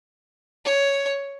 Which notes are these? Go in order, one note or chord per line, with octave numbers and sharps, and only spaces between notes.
C#5